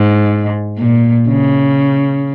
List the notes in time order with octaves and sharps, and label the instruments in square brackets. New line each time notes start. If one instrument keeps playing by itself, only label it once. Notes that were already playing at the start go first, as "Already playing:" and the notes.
Already playing: [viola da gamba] G#2
A#2
C#3